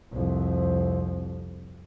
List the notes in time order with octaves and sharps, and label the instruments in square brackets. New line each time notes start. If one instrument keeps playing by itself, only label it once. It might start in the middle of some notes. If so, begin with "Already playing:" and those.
[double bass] C2 F2